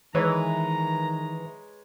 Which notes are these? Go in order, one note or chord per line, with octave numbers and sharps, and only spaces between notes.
D#3 E3 G#3 B4 C#5 A#5